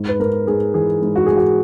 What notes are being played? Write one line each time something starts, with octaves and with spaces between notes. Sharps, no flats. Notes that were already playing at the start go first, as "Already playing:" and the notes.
Already playing: G#2
B4
G#2 A#4
G#2 G#4
E3 G#4
G#2
F#4
G#2 G#4
F#4